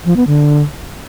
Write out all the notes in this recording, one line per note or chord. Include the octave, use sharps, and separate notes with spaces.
F3
B3
D3